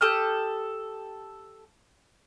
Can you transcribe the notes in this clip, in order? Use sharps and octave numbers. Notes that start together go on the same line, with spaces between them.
G4 A4 D#6 F6